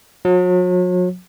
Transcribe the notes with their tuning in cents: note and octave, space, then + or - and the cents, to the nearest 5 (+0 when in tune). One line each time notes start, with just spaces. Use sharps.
F#3 -40